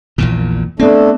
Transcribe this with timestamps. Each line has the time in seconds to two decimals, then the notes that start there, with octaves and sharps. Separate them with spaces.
0.18 A#1 E2 A#2
0.80 A3 B3 C4 D4